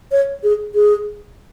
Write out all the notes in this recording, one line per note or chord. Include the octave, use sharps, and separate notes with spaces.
C#5
G#4
G#4